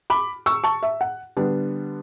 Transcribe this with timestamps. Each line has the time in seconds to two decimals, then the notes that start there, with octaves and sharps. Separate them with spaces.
0.10 B5 D6
0.46 C#6 E6
0.64 A5 C#6
0.83 E5
1.01 F#5
1.37 D3 G3 B3 D4